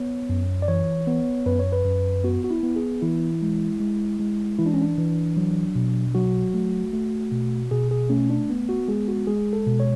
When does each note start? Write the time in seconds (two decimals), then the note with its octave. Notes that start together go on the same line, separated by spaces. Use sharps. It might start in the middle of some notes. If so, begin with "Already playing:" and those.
Already playing: B3 C#5
0.29 F#2
0.62 D5
0.68 E3 C#5
1.07 B3
1.46 F#2 B4
1.59 C#5
1.72 B4
1.85 F#2
2.24 B3 F#4
2.44 F#4
2.51 E4
2.63 B3
2.76 G#4
3.02 E3 E4
3.42 G#3
3.80 G#3
4.20 G#3
4.59 E3 E4
4.66 D4
4.74 C#4
4.81 D4
4.98 E3
5.37 F#3
5.75 B2
6.15 F#3 F#4
6.54 A3
6.93 A3
7.32 B2
7.71 B2 G#4
7.91 G#4
8.10 A3 C#4
8.30 D4
8.50 B3
8.69 F#4
8.88 G#3 G#4
9.08 F#4
9.27 G#3 G#4
9.53 A4
9.67 B2
9.80 C#5